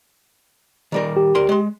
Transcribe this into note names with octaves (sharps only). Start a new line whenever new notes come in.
D#3 G3 A#4
G4
D2 A#4 C6
G#3 C6